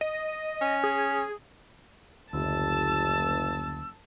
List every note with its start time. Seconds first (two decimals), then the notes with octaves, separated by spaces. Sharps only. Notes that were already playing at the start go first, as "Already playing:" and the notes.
0.01 D#5
0.61 C#4
0.84 G#4
2.33 F#1 D2 A5 E6